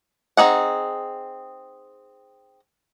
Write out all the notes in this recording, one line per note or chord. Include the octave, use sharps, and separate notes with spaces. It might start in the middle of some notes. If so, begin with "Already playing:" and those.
C4 D#4 G#4 F#5